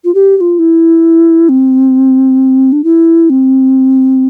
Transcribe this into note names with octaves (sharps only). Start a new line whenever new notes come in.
F4
G4
G4
F4
E4
C4
D4
E4
C4